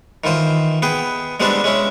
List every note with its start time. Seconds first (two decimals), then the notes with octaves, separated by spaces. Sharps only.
0.24 D#3 E3 F4 C5
0.82 B3 G#4 G5
1.40 G3 G#3 B3 C4 D4 C5
1.64 G#3 C#4 E4